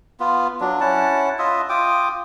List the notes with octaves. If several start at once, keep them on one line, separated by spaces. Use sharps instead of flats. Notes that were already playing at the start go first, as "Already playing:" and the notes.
B3 F4
F#3 D4
C#4 E4 F#5 A5
F4 D#5 E5
F4 G5 D6 D#6